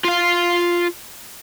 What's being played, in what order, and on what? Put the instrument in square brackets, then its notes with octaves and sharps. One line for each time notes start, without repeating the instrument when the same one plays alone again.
[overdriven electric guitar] F4 F5